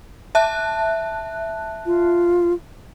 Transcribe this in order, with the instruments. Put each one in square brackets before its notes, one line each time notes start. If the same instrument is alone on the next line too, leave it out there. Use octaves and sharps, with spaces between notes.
[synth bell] E5 A5 F#6
[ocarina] F4